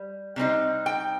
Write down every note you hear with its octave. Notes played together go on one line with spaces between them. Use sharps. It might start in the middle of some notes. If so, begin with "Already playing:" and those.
Already playing: G3
C3 G3 C4 D#4
G5